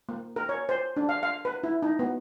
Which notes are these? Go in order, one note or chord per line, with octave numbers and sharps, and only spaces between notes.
A#3
A#4
C#5
C5
D4
F5
F5
B4
E4
D#4
B3